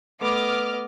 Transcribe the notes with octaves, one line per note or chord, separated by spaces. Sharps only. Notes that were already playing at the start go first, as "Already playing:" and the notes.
A3 B3 A4 B4 D#5 D6 F6